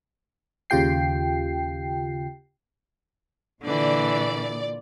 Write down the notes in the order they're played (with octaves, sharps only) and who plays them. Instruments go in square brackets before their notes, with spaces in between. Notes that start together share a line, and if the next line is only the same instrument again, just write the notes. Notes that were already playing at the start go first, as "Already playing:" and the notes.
[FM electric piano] D#2 C#3 F4 G4 G5 C7
[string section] A#2 D5 [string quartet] D3 E3